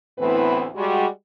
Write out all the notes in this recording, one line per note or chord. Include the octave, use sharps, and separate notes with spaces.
D2 A2 E3 B3 C4 B4
G3 G#3 F#4